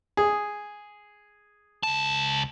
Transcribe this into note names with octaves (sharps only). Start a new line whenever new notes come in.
G#4
C#2 A5